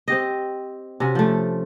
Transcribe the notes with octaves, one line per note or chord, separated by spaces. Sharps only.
C4 G4 D#5
C3 C#4 F#4
F3 A3